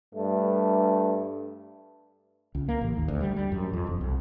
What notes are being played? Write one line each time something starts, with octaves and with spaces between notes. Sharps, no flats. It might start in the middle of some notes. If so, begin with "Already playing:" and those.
G2 A3
C#2
A#3
A1
D#2
D2
G3
G3
F#2
F2
E1
C2